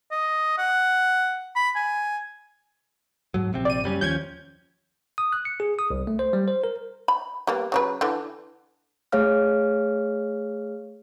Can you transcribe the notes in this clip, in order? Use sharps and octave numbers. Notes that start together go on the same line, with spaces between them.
D#5
F#5
B5
G#5
G#2 F#3
A#1 C3 C4
D5 D#7
F#1 G3 C#4
D#2 F3 C#4 G6 G#6
D#6
F#6
C#7
G#4
D#6
C2
A3
C5
G3
C5
A#4
B5
G3 A#3 B3
C#3 F#3 B4
D3 E3
A3 G#4 C#5 F5 F6